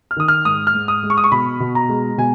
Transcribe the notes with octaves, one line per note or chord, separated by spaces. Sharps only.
F6
D#3 D#6
F6
G#2 D#6
F6
G#2
D#6
G#3
C#6
D#6
C#6
B2 B5
B2
A#5
G#3
B2 G#5